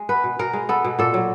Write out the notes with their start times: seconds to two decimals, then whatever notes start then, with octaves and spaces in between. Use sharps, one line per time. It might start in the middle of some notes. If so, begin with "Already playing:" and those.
Already playing: G#3
0.09 B3 B4
0.24 B2
0.39 B2 A#4
0.53 G#3
0.69 B3 A4
0.84 B2
0.99 A#2 A4
1.14 F#3